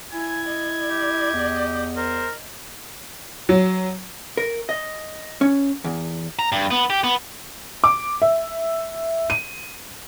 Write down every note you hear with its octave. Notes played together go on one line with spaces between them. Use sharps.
E4 G#5 G#6
D#5
G4
E2
A#4 C5
F#3
A#4
D#5
C#4
E2
A#5
G2
B3
G4
B3
D6
E5
D#7